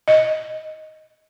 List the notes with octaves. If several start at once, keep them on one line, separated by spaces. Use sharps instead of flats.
D#5